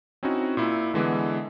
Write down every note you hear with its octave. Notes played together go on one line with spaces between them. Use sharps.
C4 C#4 D#4 E4 F#4
A#2 E4
D3 E3 G#3 B3